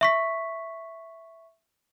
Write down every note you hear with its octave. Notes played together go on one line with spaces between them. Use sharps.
E5 C#6 B6